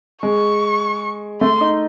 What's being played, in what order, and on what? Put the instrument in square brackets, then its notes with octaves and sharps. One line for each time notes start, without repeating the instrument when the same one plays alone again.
[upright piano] G#3 [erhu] C#6
[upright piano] A3 [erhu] C6
[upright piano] D#4